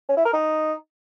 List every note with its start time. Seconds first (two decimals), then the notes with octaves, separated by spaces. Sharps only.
0.09 C#4
0.17 E4
0.25 A#4
0.33 D#4